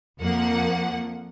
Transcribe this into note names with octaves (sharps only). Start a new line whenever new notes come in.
F2 F3 A#3 F#5